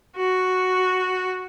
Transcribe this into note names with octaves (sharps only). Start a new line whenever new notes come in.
F#4